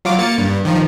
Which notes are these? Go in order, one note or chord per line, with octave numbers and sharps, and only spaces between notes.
F#3 F4 D6
A#3 A6 C#7
G2
D#3 F3